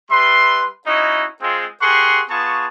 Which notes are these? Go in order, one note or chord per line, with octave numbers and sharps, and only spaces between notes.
G3 B4 E5 C6
C#4 D#4 E4 F#4 D#5
G#3 C4 F4
G4 G#4 A#4 F#5 C6 C#6
B3 F4 G#4 A5 C#6